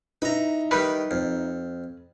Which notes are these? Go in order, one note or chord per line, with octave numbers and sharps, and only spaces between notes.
D#4 E4 B4 A#5
D#3 G3 B4
F2